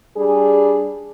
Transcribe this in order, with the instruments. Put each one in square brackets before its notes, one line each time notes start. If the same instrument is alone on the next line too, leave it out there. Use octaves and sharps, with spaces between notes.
[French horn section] G3 D4 G#4